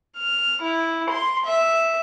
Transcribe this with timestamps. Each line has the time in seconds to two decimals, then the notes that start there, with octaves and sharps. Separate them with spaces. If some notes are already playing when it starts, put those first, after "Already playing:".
0.17 F6
0.61 E4
1.09 C6
1.45 E5